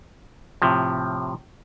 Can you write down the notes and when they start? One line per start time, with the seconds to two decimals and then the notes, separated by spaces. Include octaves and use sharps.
0.62 A2 C3 F3